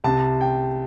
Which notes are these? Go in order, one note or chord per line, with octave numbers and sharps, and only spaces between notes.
C2 C3 A5
G5